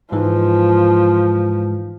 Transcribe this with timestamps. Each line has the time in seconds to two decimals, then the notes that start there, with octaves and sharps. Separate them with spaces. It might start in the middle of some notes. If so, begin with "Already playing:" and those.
0.12 G#2 E3 F3 G#3